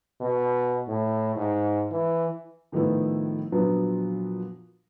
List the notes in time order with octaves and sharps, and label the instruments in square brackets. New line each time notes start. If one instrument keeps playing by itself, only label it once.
[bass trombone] B2
A2
G#2
E3
[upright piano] A2 D#3 F3 A3 B3 E4
A#2 F3 F#3 B3 D4